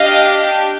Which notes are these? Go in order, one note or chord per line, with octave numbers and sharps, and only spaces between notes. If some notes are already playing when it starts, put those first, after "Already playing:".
Already playing: D4 G4 D#5 F5